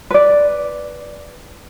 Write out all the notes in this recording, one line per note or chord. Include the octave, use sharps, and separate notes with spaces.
B4 D5